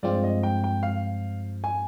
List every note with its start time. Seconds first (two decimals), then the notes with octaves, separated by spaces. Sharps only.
0.03 G2 F3 G#3 C4 F4 D5
0.24 D#5
0.43 G5
0.64 G5
0.83 F5
1.64 G#5